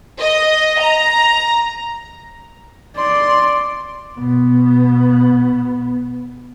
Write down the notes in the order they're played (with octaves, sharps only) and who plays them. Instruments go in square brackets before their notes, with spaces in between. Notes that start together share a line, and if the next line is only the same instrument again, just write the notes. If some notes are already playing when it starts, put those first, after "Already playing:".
[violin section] D#5
A#5
[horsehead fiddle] D5 [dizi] C6
[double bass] B2 B3